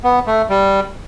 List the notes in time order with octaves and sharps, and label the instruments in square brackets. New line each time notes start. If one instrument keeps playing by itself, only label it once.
[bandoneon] B3
A3
G3